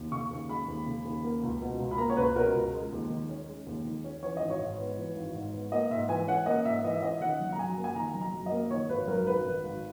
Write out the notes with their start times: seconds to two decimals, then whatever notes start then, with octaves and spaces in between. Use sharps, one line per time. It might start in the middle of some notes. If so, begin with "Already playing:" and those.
Already playing: D#2
0.12 C#3 C#6
0.31 D#2
0.49 G#3 B5
0.68 D#2
0.86 C#3
1.05 D#2
1.24 A#3
1.43 C#2
1.62 B2
1.80 C#2
1.91 B5
1.98 A#3 A#5
2.10 C#5
2.17 C#2 B4
2.35 B2 A#4
2.54 C#2
2.73 G#3
2.92 D#2
3.10 D#3
3.29 C#4
3.48 G#3
3.66 D#2
3.85 D#3
4.04 C#4
4.22 E3 C#5
4.37 G#1 D#5
4.50 C#5
4.60 G#2
4.78 B3
4.97 E3
5.16 G#1
5.35 G#2
5.53 B3
5.72 A#3 D#5
5.91 G#2 E5
6.09 E3 G#5
6.27 C#4 F#5
6.46 A#3 D#5
6.65 G#2 E5
6.84 E3 D#5
6.94 E5
7.03 C#4 D#5
7.21 D#3 F#5
7.39 F#1
7.52 A#5
7.58 F#2 G#5
7.78 A#3
7.84 G#5
7.96 D#3 A#5
8.14 F#1
8.21 A#5
8.33 F#2
8.46 D#5
8.52 A#3
8.70 D#3 C#5
8.89 G#1 B4
9.07 F#2 A#4
9.26 G#1 B4
9.45 D#3
9.64 G#1